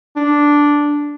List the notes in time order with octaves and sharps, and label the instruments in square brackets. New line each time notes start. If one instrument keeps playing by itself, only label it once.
[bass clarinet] D4